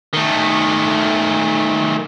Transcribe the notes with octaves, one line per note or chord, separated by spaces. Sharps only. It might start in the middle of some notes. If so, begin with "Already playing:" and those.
D#3 A3